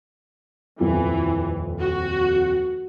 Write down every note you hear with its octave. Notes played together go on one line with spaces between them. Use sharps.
D#1 F2 E3 F4
F#4